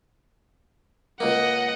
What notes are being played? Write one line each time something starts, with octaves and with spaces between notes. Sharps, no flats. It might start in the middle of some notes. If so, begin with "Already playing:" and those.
C#2 A#3 D#5 F#5